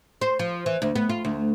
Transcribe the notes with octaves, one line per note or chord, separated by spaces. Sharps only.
C5
F3
E3
D2
B3
F4
D2